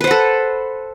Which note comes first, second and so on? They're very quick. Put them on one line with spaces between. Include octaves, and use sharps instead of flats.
B4 C5 F#5 A4